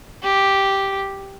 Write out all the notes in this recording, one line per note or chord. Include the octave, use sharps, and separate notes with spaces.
G4